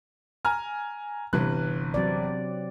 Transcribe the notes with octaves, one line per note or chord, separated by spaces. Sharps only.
G#5 A#5 F6
G1 C3 E3 F#6
F#3 C4 D5